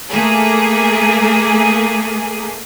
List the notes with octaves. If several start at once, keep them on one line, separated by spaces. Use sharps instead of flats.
A3 A#3 G#4